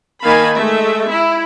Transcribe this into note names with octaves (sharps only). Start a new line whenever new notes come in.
D#3 A#3 F5 G#5 A5 B5
G#3 A3 E5
E4